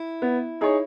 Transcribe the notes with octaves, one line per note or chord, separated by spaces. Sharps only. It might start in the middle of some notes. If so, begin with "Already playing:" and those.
Already playing: E4
B3
D#4 G#4 C#5